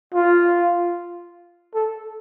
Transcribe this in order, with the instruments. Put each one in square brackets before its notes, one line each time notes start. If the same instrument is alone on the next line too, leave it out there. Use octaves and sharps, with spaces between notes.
[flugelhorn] F4
A4